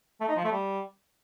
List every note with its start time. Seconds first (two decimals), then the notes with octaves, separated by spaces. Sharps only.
0.21 A3
0.29 D#4
0.36 F3
0.44 A3
0.52 G3